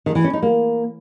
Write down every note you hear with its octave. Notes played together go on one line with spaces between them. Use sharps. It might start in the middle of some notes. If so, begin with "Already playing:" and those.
D#3
E3
C#4
D#4
A#3